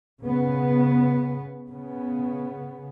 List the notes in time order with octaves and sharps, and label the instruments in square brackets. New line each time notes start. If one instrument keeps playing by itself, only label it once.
[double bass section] C#3 B3
C#3 B3